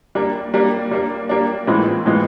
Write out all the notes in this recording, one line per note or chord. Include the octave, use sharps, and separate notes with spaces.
G3 A#3 D4
G3 A#3 D4
G3 A#3 D4
G3 A#3 D4
A2 E3 G#3 C4 F4
A2 E3 G#3 C4 F4